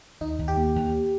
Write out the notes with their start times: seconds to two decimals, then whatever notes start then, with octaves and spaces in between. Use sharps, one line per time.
0.21 D#2 D#4
0.39 D#2
0.48 G4
0.57 A#3
0.75 D#2